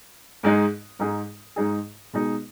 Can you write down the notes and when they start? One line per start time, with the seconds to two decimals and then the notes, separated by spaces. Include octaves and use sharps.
0.43 G#2 G#3 D#4 G#4
0.99 G#2 G#3 D#4 G#4
1.56 G#2 G#3 D#4 G#4
2.13 B2 G#3 D#4